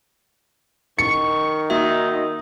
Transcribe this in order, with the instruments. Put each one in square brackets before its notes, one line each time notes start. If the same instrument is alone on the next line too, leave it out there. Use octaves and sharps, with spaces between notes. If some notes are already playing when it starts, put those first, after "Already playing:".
[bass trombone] D#3 [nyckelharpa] C#6 [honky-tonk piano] C#7
[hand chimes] A#3 F#4 E5 [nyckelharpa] D#4